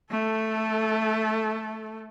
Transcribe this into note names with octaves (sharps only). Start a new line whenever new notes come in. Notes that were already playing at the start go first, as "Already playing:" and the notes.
A3 A4